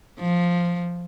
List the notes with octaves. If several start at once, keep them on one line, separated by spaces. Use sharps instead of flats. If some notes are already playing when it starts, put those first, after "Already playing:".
F3